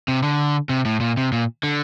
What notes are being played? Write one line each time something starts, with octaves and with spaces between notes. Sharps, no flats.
C3
D3
C3
A2
A#2
C3
A#2
D3